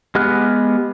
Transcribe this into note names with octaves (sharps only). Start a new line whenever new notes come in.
G#3 B3 G4 F6 F#6